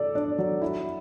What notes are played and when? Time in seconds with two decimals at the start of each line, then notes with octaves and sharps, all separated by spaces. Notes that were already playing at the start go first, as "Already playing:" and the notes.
Already playing: A4 D5
0.15 D4
0.38 F#3
0.62 E4